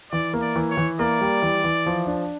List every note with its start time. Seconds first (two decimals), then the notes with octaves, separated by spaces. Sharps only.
0.12 E3 D5
0.33 A#3
0.41 D5
0.56 E3
0.70 C#5
0.77 E3
0.99 A#3 D5
1.21 G3
1.42 E3
1.64 E3
1.86 F3
2.07 D4